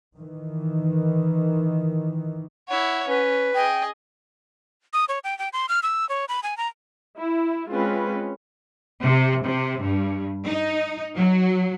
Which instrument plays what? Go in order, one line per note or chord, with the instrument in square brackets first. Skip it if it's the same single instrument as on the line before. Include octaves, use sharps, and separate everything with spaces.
[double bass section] D#3 E3
[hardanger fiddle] E4 C#5 [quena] F#5
[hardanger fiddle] C#4 [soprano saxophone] B4
[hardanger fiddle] G#4 D#5 [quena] G5
[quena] D#6
C#5
G5
G5
C6
F6
E6
C#5
B5
G#5
A#5
[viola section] E4
G#3 C4 C#4 F4 B4
[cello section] C3
C3
G2
D#4
F#3